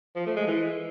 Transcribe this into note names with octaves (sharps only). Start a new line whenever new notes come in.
F3
A3
G#3
E3